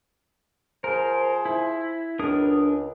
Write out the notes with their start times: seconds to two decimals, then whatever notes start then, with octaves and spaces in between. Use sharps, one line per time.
0.84 F3 G#4 A#4 C5
1.45 E4
2.19 C#2 D4 A#4 D#6